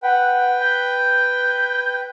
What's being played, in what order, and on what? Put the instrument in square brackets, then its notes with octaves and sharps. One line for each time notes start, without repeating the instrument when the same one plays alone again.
[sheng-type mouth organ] B4 G5 [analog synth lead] F#5
[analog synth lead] G6